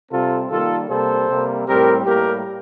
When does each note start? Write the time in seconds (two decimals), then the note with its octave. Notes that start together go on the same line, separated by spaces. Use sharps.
0.11 C3 G3 C4 F4 A4
0.50 D#3 G3 A#3 F4 A4
0.89 C3 G3 A#3 A4 C5
1.28 C3 G3 A#3
1.67 A2 G3 C4 G4 A#4
2.06 A2 G3 A#3 G4 A#4